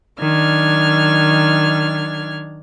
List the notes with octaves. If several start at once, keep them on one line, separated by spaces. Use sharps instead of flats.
D#3 F#3 D4 F6 G#6